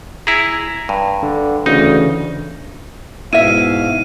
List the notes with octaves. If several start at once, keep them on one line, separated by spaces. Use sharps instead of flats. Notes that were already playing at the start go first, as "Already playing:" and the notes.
E4 G#4 A#5
G2
D3
D2 C#3 E3 D#4
G#2 B2 E4 E5 F5 D#7